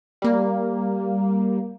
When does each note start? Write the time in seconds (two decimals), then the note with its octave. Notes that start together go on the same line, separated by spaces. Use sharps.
0.22 G3 A#3